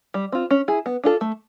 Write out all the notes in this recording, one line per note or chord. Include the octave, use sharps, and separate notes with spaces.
G3
C4 F4
C#4
E4 G#4
B3
D4 F4 A4
A3